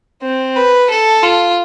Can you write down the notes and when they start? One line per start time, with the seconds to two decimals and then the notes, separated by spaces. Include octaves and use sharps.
0.22 C4
0.56 B4
0.90 A4
1.23 F4